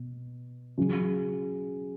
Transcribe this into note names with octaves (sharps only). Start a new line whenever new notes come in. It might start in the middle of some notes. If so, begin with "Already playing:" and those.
Already playing: B2
C#3 F#3